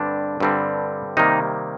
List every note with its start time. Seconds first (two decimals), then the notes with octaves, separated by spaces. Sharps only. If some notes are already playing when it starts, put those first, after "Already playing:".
Already playing: G2 D3 G3 C4 D4
0.40 G2 D3 G3 C4
1.17 C3 D#3 G3 A#3 D#4